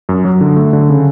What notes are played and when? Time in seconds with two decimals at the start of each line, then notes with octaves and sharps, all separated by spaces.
0.09 F#2
0.25 F#3
0.41 D3
0.56 A3
0.73 D3
0.89 C#3